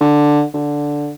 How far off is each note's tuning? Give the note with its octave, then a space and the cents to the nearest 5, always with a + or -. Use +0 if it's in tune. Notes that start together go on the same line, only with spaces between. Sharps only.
D3 +5
D3 -5